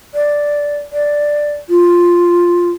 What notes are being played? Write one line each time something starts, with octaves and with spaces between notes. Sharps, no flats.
D5
D5
F4